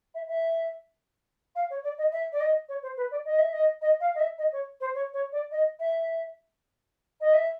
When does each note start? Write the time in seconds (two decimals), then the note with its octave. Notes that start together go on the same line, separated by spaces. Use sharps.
0.15 E5
0.28 E5
1.56 F5
1.70 C#5
1.84 D5
1.98 D#5
2.12 E5
2.33 D5
2.40 D#5
2.69 C#5
2.82 C5
2.97 B4
3.11 D5
3.25 D#5
3.39 E5
3.53 D#5
3.82 D#5
4.01 F5
4.15 D#5
4.20 E5
4.38 D#5
4.52 C#5
4.81 C5
4.95 C#5
5.14 C#5
5.32 D5
5.51 D#5
5.80 E5
7.21 D#5
7.34 E5